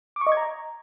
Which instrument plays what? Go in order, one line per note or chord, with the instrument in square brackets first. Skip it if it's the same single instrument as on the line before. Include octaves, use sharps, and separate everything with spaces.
[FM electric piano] D6
C#6
D#5
G#6
A#5